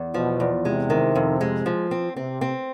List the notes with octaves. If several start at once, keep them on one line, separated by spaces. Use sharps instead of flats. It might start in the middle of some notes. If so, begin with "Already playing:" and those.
Already playing: E2
B2 F3
E2
C3 G#3
D#3
F2
G#3
F3
C4
C3 C4
C4